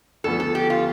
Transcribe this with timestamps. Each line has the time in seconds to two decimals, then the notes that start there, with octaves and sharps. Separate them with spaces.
0.24 D2 D3 F3 B3 A4
0.40 A4
0.55 G4
0.70 F4